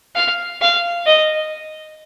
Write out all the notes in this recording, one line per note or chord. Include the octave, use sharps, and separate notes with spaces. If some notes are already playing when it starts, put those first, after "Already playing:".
F5
F5
D#5